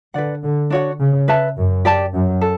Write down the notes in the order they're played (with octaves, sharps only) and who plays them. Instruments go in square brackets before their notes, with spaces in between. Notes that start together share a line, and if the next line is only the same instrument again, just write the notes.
[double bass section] D3 [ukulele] B4 D5 F#5
[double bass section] D3
[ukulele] D4 F#4 C#5 F#5
[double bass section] C#3
[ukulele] B4 E5 A5
[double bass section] F#2
[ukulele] G4 D5 A5
[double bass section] F#2
[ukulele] A4